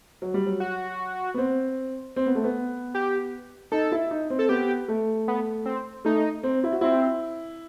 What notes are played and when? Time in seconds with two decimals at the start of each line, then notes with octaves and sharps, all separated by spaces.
0.22 F#3
0.34 G3
0.46 F#3
0.60 F#4
1.34 B3
1.38 C4
2.16 C4
2.26 B3
2.35 A3
2.44 B3
2.95 G4
3.72 D#4 A4
3.92 E4
4.11 D#4
4.30 C4
4.39 A4
4.49 B3 G4
4.88 A3
5.28 B3
5.66 C4
6.05 A3 D#4
6.43 C4
6.64 E4
6.72 F#4
6.81 C4 E4